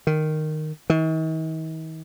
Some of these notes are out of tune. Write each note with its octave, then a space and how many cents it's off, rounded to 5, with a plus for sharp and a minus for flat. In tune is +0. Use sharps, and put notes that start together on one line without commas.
D#3 -10
D#3 +45